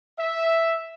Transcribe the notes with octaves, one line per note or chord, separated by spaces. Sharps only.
E5